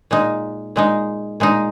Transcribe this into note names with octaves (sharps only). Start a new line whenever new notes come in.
A#2 G#3 D#4
A#2 G#3 D#4
A#2 G#3 D#4